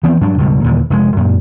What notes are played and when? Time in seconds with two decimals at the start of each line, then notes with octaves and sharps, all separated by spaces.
0.03 E3 B3 C4
0.21 G2 F#3 D4
0.38 C#2 G2 B2
0.64 D#2 A#2 D3 E3
0.90 F1 B2 G#3
1.17 F#2 A#2